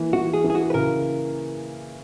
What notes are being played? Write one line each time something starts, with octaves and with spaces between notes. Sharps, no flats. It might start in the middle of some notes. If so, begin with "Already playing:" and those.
Already playing: E3 A#3
E3 F#4
G#4
E3
G#4
F#4
B4
C#3 A#4